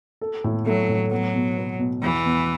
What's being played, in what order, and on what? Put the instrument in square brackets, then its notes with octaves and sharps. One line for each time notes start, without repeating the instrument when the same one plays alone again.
[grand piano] A4
A2
[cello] F#3 [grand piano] A3
[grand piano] A2
[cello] F#3 [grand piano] B3
[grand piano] B2
B3
B2
[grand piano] E2 [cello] E3
[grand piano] E2